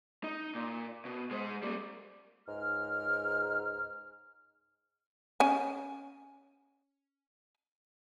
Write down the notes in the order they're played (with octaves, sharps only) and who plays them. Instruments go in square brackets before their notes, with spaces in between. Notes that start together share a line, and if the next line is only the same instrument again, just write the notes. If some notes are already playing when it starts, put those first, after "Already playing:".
[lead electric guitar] D#4
A#2
B2
G#3 C5
G3 A#3
[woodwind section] C#2 G#2 F6
[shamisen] C#4 G#5